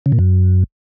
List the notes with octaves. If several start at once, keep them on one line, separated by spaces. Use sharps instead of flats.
C#3
A#2
F#2